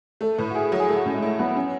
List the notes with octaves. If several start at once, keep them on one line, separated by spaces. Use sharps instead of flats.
A3 A4
A2 B4
F#4
E4 G#4
F#3 F#4
G#4
A3 A4
F#4
A2 C#4
G#3
A3 E4
F#3 B3
F#3 C#4